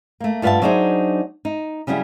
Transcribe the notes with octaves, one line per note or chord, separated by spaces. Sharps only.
A3 A#3
G2 F4 B4 E5 F#5 A5
F#3 D4 D#4 G#4 C5 E5
D#4
C#3 F#3 G3 E4 G#4